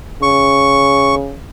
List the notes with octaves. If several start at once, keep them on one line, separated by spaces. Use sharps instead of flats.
C#3 C#6